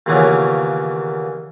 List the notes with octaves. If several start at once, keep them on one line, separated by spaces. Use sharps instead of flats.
D#2 A#2 C#3 E3 B3 C#5